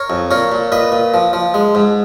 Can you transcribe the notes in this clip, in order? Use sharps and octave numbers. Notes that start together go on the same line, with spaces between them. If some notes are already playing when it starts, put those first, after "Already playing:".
Already playing: A#4 C#5
F2
A#2 A#4 C#5
A#2
A#2 B4 D#5
A#2
F3
F3
G#3
G#2